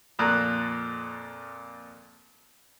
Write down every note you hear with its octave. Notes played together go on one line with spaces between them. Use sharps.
F2 A#2 A#5 F#6